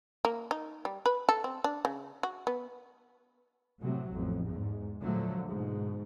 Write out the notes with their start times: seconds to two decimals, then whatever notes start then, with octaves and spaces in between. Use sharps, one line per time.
0.25 A#3
0.51 D#4
0.85 G3
1.06 B4
1.29 A4
1.44 C4
1.64 D4
1.85 C#3
2.23 F#4
2.47 B3
3.80 A2 C3 F#3
4.10 A1 F2
4.46 E2 G#2
5.00 A#2 D3 F3 F#3 A3
5.47 G#2 B2